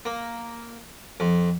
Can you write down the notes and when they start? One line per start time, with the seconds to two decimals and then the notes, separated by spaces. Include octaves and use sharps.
0.05 A#3
1.20 F2